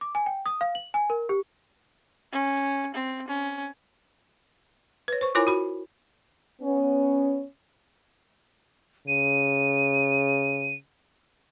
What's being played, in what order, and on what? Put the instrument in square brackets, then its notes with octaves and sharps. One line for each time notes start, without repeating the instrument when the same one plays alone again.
[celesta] D6
G#5
G5
D#6
F5
F#7
G#5
A#4
G4
[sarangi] C#4
C4
C#4
[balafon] B4 C#5
C5 C#6
E4 F4 A#4 C#5 G#5 B5
F#4 B5
[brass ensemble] B3 C#4
[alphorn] C#3 [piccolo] D#7